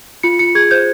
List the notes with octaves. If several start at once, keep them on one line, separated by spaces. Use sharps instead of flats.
F4 C#7
F4 C#7
G#4 G#6
C5 G6